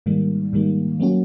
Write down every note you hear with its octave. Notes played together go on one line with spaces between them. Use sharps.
G#2 D#3 G3 A#3
G#2 D#3 G3 A#3
F#3 A#3 C#4 F#4